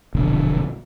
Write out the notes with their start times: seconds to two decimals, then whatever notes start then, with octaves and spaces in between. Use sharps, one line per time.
0.15 E1 A#1 D3